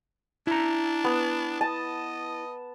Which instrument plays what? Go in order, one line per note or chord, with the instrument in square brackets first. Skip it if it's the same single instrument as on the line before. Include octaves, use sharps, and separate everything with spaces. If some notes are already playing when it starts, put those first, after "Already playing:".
[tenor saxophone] D4 [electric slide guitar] E4 A#5
[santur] B3
[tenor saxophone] D#5 [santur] A5